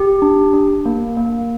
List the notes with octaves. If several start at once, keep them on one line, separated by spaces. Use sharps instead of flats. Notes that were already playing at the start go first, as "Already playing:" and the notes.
Already playing: G4
D4
D4
A#3
A#3